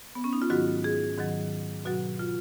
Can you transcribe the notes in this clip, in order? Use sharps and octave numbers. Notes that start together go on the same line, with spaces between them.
B3
C#4
D#4
F4
G#2 D#3 F#3 F#4
G#4
G#2 D#3 F#3
B2 F#3 F#4
F4